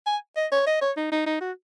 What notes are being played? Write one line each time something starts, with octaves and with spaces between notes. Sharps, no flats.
G#5
D#5
C#5
D#5
C#5
D#4
D#4
D#4
F#4